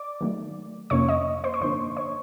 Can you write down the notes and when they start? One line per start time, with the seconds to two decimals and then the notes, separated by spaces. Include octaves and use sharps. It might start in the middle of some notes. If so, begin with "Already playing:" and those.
Already playing: D5 D6
0.21 D#3 F#3 A3
0.90 F2 C3 F3 A#3 C#4 C#5 C#6
1.08 D#5 D#6
1.44 C5 C6
1.54 C#6
1.61 G2 D3 F3 A#3 D4 C5 C6
1.97 C#5 C#6